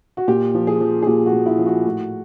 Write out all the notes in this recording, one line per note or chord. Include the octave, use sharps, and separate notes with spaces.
F#4
A#2 G4
F3
G#4
F3
G#4
A#2 G4
F#4
A#2
E4
F3
F#4
A2